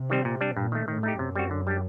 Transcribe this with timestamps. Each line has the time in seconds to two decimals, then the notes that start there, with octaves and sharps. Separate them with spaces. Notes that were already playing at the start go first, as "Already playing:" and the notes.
Already playing: C3
0.10 D#3 G3 C4
0.25 A#2
0.41 G3 D4
0.56 G2 A#2
0.72 D#3 A3
0.88 A2 D#3
1.03 A3 D#4 G4
1.19 F#2 C3
1.35 G3 C4 F#4
1.51 D3
1.67 G3 D4 G4